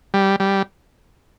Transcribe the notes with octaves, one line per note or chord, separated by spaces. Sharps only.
G3
G3